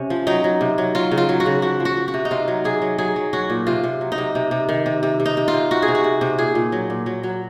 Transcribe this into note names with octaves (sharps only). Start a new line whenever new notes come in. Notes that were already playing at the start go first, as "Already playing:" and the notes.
Already playing: C3 C#4
F3
F#3 D#4
F#3
C3
F#3
F#3 F4
C#3
F4
F#3
F#4
C#3
F3 F#4
F3
F#4
F3
F#4
C3
D#4
C3 F4
F#3
C3 G#4
F#3
F#3 G#4
F#3
F#3 F#4
A#2
C3 F4
C3
F#3
D#4
C3
C3
C3
D#3
C3
C3
C3
D#4
C3
F4
C3
F3 F#4
G#4
C3
F#4
C3
C3
A#2 G#4
A#2
F#3
A#2
F#3
F#3